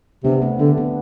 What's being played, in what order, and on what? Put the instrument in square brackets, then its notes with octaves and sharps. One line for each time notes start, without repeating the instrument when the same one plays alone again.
[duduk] C3 [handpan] B3 D4
[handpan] A3 C4
[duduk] D3 [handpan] B3 D4
[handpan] B3 D4